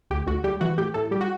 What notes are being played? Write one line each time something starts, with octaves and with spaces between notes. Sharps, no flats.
D2 G4
D2 F#4
G3 G4
E3 F#4
A2 G4
A2 A4
G3 G4
F#4